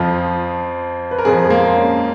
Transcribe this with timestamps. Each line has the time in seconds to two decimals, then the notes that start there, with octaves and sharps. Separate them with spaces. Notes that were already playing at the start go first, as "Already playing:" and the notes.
Already playing: F2 F3 F4
1.11 B4
1.18 A#4
1.25 F2 F3 G#4
1.46 G#3
1.50 A#3
1.76 C#4